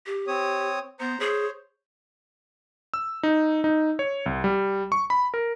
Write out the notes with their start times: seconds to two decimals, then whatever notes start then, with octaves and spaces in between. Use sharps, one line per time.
0.06 G4
0.27 C4 C#5 D#6
1.00 B3 C5 A#5
1.20 G#4 C5 C#5
2.94 E6
3.23 D#4
3.64 D#4
3.99 C#5
4.26 C2
4.44 G3
4.92 C#6
5.10 B5
5.34 A#4